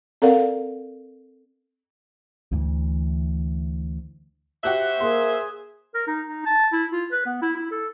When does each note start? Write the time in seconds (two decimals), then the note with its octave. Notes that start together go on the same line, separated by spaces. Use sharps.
0.22 C4 A4 A#4 D5 F5 F#5
2.52 D2 E3
4.64 F#4 G4 C5 E5 F#6
5.00 A#3 G#4 C6
5.94 A#4
6.07 D#4
6.27 D#4
6.46 A5
6.72 E4
6.92 F4
7.12 B4
7.26 B3
7.42 E4
7.56 E4
7.71 A4